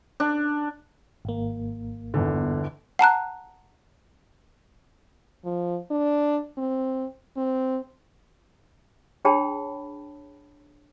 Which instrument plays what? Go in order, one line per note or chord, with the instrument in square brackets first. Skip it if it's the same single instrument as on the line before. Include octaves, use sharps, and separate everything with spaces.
[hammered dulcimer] D4
[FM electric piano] G#1 A#3
[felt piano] G1 E2 D3
[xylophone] F#5 A5 A#5 F#6
[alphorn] F3
D4
C4
C4
[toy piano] D4 G#4 C#5 G5 A5 B5